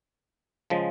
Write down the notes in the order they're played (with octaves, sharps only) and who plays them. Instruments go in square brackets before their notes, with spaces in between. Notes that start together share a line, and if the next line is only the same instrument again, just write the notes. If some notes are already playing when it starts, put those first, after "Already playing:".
[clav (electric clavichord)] C#3 F3 G#3